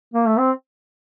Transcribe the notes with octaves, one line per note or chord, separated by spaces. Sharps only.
A#3
A3
C4